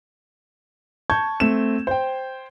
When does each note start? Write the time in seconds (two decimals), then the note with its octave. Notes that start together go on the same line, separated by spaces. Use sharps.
1.10 A5 C#6 G6 G#6
1.40 A3 C4 E7
1.87 C5 G5